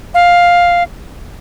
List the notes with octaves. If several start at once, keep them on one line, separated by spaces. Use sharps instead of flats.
F5